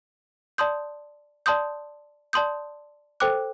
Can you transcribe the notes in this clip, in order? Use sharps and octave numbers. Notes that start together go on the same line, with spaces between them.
D5 A5 C6 D#6 G6
D5 A5 C6 D#6 G6
D5 A5 C6 D#6 G6
A4 C5 G5 D6 F#6